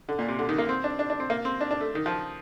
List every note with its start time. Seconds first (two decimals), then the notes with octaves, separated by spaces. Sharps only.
0.09 D3
0.19 A#2
0.28 C3
0.39 D3
0.49 D#3
0.58 A#3
0.69 C4
0.84 D4
0.99 D4
1.10 D4
1.20 C4
1.30 A#3
1.45 C4
1.61 D4
1.71 D4
1.81 A3
1.95 D#3
2.06 F3